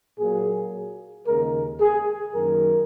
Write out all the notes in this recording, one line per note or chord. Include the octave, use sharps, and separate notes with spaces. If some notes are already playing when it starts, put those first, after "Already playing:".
A#2 F#3 A#3 G#4
D#2 C#3 G#3 A#4
G#4
F#2 D#3 F#3 A#3 A#4